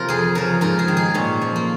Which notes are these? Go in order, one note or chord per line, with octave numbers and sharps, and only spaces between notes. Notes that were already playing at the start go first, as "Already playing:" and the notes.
Already playing: C3 F3 F4 A#4
F2 G#4
C#3 F3 A#4
G#2 A#4
G#4
D#3
G#4
A#2 C#4
F3
A#3